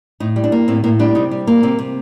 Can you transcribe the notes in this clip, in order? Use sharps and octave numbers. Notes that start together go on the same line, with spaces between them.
A2 D#4
G3
D4
A#3
A2 C4
A2 A#3
G3 D4
C3 D#4
G3
A#3
C3 C4
C3